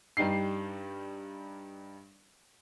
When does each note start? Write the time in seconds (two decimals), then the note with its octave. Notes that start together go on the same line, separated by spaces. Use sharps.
0.17 G2 G3 D#4 C7